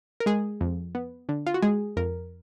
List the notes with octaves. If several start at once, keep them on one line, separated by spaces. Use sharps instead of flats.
A#4
G#3 G#4
F2
B3
D3
F4
F#4
G#3 G#4
F2 A#4